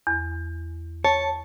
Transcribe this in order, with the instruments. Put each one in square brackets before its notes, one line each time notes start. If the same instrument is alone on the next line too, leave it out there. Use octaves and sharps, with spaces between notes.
[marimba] E2
[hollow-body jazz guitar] C#5 [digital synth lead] A5